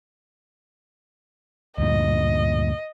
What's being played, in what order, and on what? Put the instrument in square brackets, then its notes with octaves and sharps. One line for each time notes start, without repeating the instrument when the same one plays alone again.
[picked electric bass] D2 G2 A#2 [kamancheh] D#5